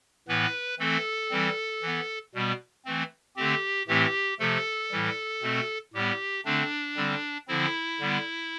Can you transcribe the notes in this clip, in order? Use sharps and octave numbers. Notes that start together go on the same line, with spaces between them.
A2 E3 B3 B4
E3 A3 C4 A4
E3 G3 C4
E3 B3
B2 G3 B3
E3 A3 C4
D3 A3 C4 G4
A2 E3 A3 C4 G4
C3 F3 A3 A4
A2 E3 G3
B2 A3 C4
A2 G3 B3 G4
D3 A3 C4 D4
D3 G3 C4
D3 F3 C4 E4
D3 G3 B3